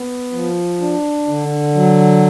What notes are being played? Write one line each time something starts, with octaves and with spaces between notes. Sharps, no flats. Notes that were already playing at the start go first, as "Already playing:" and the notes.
Already playing: B3
F3
D4
D3
F#3